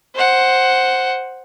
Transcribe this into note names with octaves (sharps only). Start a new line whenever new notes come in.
C5 F#5